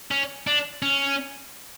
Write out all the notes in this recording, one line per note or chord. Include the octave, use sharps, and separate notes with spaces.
C#4
D4
C#4